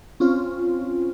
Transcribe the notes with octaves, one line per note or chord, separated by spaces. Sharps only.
C4 C#4 F4